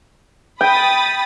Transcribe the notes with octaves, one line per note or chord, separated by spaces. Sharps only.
G5 B5 D#6 A6